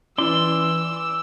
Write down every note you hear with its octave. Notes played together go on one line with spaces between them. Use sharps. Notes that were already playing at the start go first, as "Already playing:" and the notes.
E3 C#4 E4 D5 C6 E6